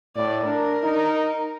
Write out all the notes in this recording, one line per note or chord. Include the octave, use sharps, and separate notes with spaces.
A2 D5
D4 A#4
D#4